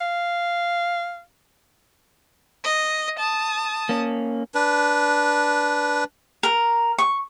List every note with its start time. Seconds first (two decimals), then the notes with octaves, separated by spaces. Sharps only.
0.01 F5
2.64 D#5
3.19 A5 D#6
3.89 A#3 C#4
4.55 D4 B4
6.43 A#4
6.98 C#6